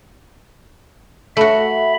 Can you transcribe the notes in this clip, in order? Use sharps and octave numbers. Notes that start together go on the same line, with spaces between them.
A3 F#4 E5 B5